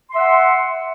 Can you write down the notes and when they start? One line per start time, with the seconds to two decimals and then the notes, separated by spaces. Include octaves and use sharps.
0.11 C6
0.14 E5
0.17 F#5